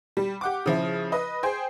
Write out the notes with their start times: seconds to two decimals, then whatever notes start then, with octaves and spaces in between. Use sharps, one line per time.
0.17 G3
0.41 G4 F#5 D6
0.66 C#3 F3 E4
1.12 B4 D#5
1.43 G#4 C5 G5